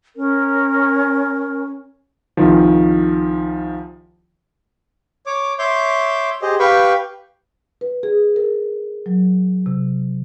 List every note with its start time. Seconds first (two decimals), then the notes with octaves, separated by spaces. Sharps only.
0.16 C#4 A#4
2.37 C2 D#3 F3
5.26 C#5 D6
5.59 C#5 E5 C6 D6 G6
6.42 G4 G#4 C5 D#5
6.59 G4 B4 F5 G5 B5 C#6
7.81 B4
8.03 G#4
8.36 A#4
9.06 F#3
9.66 C3